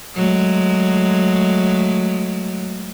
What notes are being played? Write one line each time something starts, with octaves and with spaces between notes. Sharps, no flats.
F#3 G#3 A3